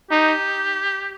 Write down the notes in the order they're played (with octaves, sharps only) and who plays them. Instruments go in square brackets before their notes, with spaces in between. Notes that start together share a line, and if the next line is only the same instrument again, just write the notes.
[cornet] D#4 [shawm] G4